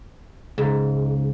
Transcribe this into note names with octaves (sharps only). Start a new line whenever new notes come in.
C#2 G#2